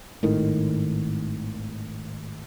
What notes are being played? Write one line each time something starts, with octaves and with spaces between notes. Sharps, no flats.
G#1 A2 D#3